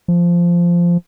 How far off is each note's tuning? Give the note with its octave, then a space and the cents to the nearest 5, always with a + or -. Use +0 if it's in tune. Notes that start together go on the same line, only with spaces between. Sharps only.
F3 -10